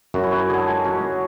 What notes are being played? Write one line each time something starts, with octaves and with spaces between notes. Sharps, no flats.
F#2 F#4
E4
F#3 F#4
D3 G#4
A4
G#3 G#4
F#3 C#4 F#4